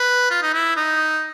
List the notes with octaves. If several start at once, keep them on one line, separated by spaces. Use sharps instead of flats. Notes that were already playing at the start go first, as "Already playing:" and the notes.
Already playing: B4
F4
D#4
E4
D#4